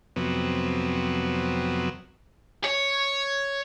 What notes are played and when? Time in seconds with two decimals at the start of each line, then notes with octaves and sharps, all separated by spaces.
0.16 F2 C3 F#3 B3
2.65 C#5